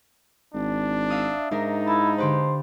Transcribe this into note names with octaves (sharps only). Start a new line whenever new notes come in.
G#1 D4
E5 F5 D#6
G#2 D4 D#4 A#4 A#5
E4 A5
D3 G4 B4 C5